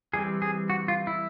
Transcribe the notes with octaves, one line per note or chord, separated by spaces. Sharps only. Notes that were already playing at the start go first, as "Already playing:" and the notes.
E3 G3 C4 G#4
G#4
F#4
F4
E4